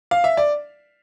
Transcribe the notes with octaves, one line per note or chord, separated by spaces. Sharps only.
F5
E5
D5